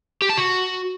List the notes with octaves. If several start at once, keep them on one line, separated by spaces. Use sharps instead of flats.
G4
A5
F#4